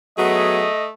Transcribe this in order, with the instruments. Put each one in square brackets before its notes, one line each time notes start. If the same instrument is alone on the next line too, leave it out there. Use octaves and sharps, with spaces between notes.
[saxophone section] F#3 B3 G#4 [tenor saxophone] A3 [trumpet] D#5